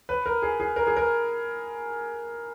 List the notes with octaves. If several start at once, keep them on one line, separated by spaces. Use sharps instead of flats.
B4
A#4
G#4
G#4
A#4
G#4
A#4